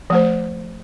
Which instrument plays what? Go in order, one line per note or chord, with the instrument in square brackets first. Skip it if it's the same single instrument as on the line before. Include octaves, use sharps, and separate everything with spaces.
[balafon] F3 A3 C5